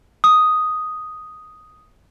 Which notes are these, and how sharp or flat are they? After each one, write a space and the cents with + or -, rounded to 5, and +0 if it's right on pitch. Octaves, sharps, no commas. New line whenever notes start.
D#6 +0